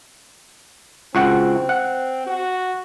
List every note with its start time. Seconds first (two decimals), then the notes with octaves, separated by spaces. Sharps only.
1.15 C#2 C4 F#4 F#5
1.69 F#5
2.27 F#4